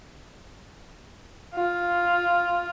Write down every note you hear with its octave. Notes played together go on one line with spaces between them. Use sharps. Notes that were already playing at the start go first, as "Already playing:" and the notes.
F4